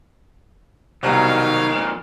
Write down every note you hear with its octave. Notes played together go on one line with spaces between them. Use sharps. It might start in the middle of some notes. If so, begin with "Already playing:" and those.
C2 B2 D#3 F#3 D#4 C#5 F5 A#5
F2 A#2